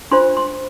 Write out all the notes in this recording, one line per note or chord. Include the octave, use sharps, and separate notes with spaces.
D4 F4 C5 C6
C6